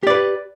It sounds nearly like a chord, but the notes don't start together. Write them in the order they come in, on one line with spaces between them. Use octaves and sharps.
G4 D5 B4